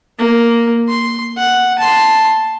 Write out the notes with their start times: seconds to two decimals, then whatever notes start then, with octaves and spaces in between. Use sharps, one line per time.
0.19 A#3
0.89 C6
1.37 F#5
1.79 A5 C6